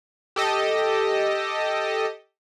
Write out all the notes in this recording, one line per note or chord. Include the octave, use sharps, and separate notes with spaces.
G4 A4 D#5